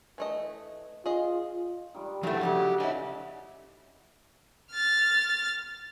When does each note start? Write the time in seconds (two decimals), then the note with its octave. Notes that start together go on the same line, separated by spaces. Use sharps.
0.18 E3 A3 D#5
1.06 F4 G#4 D#5
1.94 D#3 G3 G#3
2.23 G2 F3 F#3 A3 E4 F#4 G#5
2.41 F2 C#3 F#3 G4
2.80 D3 C#4 E4 C#5 D#5
4.71 F6 A6